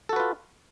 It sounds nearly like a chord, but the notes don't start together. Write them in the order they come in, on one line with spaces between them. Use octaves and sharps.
A4 F#4 B4 F4